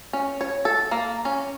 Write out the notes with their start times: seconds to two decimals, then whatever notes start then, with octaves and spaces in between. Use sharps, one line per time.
0.13 C#4
0.41 C#5
0.65 A4
0.91 A#3
1.25 C#4